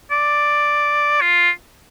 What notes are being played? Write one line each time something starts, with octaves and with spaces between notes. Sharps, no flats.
D5
F4